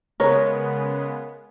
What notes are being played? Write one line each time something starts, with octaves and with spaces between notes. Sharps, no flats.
C#3 G#3 B3 A#4 C#5